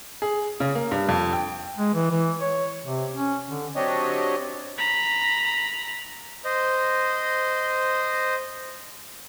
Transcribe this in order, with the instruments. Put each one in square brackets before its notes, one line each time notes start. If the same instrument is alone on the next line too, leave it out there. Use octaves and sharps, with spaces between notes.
[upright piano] G#4
C#3
A#3
G2
F2
G5
[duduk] G#3
E3
E3
C#5
C3
C#4
D3
[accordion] F#3 C4 D4 G4 C#5 D#5
[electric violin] A#5 B5
[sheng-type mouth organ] C5 D#5